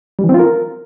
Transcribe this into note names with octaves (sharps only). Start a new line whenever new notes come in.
G3
E3
C4
F4
A#4